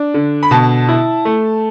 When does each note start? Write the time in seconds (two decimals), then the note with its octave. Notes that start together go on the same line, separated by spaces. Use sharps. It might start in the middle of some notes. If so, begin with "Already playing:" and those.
Already playing: D4
0.14 D3
0.43 B5
0.51 B2 A5
0.89 E4
1.25 A3